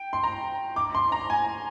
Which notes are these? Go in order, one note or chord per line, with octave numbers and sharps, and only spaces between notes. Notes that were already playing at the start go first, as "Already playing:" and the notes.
Already playing: G5
C6
A#5
D6
C6
A#5
G#5